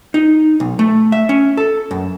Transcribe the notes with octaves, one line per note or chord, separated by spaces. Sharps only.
D#4
B1
A3
E5
C#4
A4
F#2